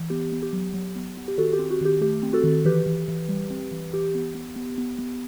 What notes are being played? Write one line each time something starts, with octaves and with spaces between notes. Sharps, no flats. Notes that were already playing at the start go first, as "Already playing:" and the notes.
Already playing: E3
B3 G4
B3
G4
F#3
F#3
B3
B3
G4
D#3 F#4 A4
G4
C4
F#4
D#3 G4
A3 G4
C4
F#4 A4
D#3
E3 G4 B4
E3
E3
G3
C4
E3
E3 G4
B3
B3
B3
B3
B3